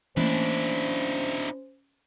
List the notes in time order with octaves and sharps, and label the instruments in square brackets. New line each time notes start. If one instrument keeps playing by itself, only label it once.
[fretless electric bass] E3 A3 A#3 [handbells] C#4 [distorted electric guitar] D4 E4 [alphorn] C5